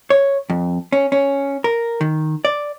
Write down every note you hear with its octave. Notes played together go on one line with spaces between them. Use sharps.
C#5
F2
C#4
C#4
A#4
D#3
D5